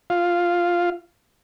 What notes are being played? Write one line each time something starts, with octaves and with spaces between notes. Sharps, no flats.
F4 F5